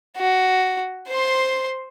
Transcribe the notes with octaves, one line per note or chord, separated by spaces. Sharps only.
F#4
C5 C6